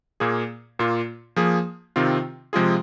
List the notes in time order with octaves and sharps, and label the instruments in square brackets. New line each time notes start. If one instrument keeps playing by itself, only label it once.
[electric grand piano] A#2 A#3 G#4
A#2 A#3 F4
F3 A#3 G#4
C3 D#3 C4 F4
C3 F3 G#3 F4 G#4